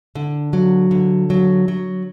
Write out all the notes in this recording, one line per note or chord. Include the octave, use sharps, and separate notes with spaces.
D3
F#3
D3
F#3
F#3